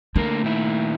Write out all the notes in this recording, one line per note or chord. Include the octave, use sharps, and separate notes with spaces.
D3 A3 A#3 A#4
A#2 D#3 E4